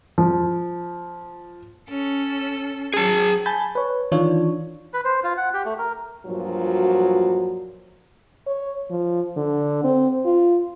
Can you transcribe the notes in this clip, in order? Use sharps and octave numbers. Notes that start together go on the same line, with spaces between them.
F3
C#4 A4
F#3 G#4 A5
G#5 A5 B5 G6 A6
B4 C#5
D#3 E3 D4 F4 C#5
B4
C5
F4
F#5
G4
A3
A#4
G2 A#2 F3 F#3 F#4
C#5
F3
D3
C4
F4